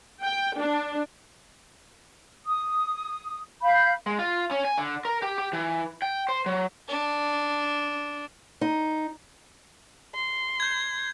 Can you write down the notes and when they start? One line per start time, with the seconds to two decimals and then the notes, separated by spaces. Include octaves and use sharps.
0.22 G5
0.57 D4
2.46 D#6
3.62 F5 B5 G6
4.06 G#3
4.19 F4
4.51 C#4
4.65 G#5
4.78 D3
5.05 A#4
5.22 G4
5.38 G4
5.53 E3
6.02 G5
6.29 C5
6.46 F#3
6.88 D4
8.61 D#4
10.15 C6
10.60 G6 G#6